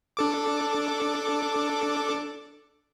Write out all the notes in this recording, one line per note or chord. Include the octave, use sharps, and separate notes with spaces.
D4 A4 D6